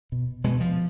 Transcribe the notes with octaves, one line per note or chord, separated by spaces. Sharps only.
B2
B2 G#3
F3